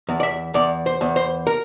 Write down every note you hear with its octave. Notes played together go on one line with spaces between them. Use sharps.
E2
D5
E5
E2 D5
C5
E2
C5
A#4